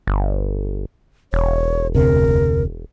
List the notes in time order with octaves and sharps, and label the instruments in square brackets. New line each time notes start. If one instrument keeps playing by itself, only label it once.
[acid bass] G1
[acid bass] E1 [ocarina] C#5
[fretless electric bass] F1 D2 C3 [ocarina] A#4